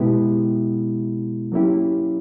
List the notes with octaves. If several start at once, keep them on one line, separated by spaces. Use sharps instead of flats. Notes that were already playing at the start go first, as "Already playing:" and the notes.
Already playing: B2 G#3 B3 E4 G4
F#3 A#3 C#4 E4 G4